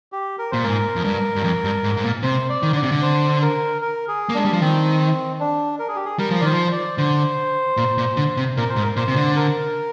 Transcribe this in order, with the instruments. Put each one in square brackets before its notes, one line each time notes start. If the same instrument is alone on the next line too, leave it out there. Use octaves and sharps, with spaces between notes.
[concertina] G4
A#4
[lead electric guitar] A#2 [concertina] C5
[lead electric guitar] G#2 [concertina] A#4
[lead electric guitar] F2
G2
G2
F2
G2
G#2
G#2
A#2
[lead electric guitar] C3 [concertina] C5
[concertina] D5
[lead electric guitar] D#3
[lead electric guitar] D3 [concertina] D5
[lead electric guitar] C3
D3
[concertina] C5
A#4
A#4
G#4
[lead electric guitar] A#3
[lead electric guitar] G#3 [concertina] D4
[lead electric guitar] G3
F3
[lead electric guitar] D#3 [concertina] C4
[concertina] D4
A#4
G#4
G4
G#4
[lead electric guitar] G3 [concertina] A#4
[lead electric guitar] F3
[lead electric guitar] D#3 [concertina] C5 D5
[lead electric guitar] F3
[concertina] D5
[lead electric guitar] D3 [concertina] C5
[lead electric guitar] A#2
A#2
D3
C3
[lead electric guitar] A#2 [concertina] A#4
[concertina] C5
[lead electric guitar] G#2
[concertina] A#4
[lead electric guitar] A#2 [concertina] C5
[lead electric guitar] C3
D3
[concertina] A#4